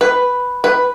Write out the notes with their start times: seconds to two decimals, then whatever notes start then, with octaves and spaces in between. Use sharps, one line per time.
0.01 B4
0.64 B4